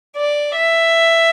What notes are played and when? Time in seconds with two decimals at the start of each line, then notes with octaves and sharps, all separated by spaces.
0.17 D5
0.55 E5